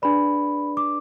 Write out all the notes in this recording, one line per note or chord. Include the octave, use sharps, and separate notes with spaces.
D4 G#4 B4 D5 B5
D6